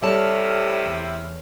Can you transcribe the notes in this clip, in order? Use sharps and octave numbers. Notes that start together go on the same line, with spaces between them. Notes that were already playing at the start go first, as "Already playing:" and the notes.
A2 C3 G3 E4 A4 C#5 A5 F6
E2